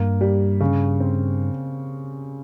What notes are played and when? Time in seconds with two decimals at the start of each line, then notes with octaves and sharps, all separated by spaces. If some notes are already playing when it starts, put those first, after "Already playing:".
Already playing: G2 A#3
0.21 G3
0.60 C#3
1.00 C4